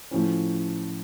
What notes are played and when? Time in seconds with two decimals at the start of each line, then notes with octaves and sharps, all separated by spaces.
0.11 A2 F3 A3 C#4